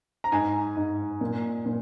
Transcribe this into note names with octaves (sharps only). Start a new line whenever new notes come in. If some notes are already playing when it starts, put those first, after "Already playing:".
A#5
G#2 G#5
G#2
A#2
A#2